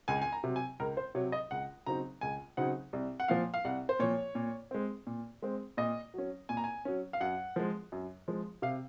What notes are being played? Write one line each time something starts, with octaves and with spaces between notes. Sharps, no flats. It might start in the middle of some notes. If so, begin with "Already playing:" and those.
C#2 G#5
G#5
A#5
C3 F#3
G#5
C#2 A#4
C5
C3 F#3 C#5
D#5
C#2 F#5
C#3 F#3 C4 D#4 A#5
C#2 G#5
C#3 F#3 C4 D#4 F#5
C2
F#5
A#2 F3 F5
F5
C2 F#5
C5
A#2 F3 C#5
A#2
G#3 C4
A#2
G#3 C4
A#2 D#5
F#3 C#4
A#2 G#5
A#5
G#5
F#3 C#4
F5
F#2 F#5
F3 G#3
F#2
F3 G#3
C3 F5